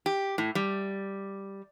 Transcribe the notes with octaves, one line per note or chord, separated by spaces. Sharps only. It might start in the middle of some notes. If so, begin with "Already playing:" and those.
G4
A2
G3